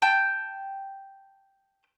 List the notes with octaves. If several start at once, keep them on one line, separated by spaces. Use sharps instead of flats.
G5 A5 G6